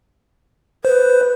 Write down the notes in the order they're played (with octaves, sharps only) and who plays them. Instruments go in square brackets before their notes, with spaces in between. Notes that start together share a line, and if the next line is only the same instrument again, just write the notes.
[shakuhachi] B4 [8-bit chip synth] C5